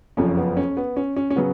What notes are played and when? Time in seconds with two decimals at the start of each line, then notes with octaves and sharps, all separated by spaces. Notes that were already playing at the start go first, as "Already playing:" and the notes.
0.17 F#1 F2 F3 C#4
0.37 B3
0.57 C#4
0.77 B3
0.97 C#4
1.16 C#4
1.30 C#4
1.36 C#3 F#3 B3